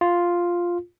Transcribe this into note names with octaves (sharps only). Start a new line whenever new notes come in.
F4